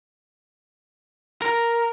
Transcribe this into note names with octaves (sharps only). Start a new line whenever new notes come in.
A#4